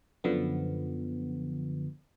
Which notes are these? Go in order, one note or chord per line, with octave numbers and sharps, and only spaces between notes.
F#2 D3 F3 B3